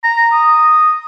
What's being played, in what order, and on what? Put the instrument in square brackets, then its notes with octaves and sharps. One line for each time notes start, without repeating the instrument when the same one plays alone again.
[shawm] A#5
D#6